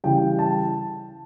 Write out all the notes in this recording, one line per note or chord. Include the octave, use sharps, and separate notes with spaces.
C#3 E3 G3 G5
A5